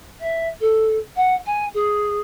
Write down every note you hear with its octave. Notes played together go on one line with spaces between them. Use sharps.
E5
A4
F#5
G#5
G#4